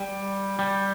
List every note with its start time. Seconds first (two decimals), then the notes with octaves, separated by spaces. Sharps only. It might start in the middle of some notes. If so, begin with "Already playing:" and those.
Already playing: G3
0.59 G3